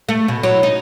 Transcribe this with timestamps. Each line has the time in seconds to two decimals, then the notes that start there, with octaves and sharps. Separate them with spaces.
0.09 A3
0.28 B2
0.43 F#3 E4
0.63 D#4